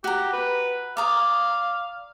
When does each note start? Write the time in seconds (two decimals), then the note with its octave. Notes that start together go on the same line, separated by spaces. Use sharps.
0.04 F#4 G4 A#5
0.33 B4
0.97 D5 F5 A#5 D#6